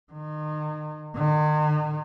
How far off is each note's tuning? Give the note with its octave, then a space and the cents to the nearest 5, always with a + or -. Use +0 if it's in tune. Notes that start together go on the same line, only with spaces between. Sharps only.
D#3 -35
D#3 -45